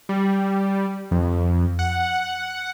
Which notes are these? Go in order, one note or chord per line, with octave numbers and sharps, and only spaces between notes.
G3
F2
F#5